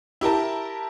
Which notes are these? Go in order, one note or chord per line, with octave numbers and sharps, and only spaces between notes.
E4 G4 A#4 A5